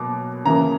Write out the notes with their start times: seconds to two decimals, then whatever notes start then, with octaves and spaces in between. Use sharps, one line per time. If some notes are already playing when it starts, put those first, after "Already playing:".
Already playing: B2 F#3 A#3 D6
0.45 C#3 E3 A#3 A#5